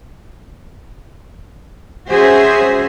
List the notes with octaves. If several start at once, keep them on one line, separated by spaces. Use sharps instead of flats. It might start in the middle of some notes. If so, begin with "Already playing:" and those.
C#4 F#4 G#4 C5 E5